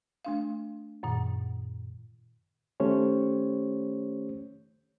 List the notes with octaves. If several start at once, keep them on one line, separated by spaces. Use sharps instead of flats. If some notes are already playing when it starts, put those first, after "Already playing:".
A3 D4 F5
F#2 A#2 D#3
D#3 A3 C#4 G4 C5 C#5